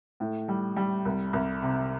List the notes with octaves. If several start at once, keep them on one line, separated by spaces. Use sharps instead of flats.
A2
G3
G3
C2
C2
C3